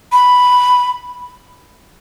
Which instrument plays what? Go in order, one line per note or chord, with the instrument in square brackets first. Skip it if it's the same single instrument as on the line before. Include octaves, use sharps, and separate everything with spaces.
[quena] B5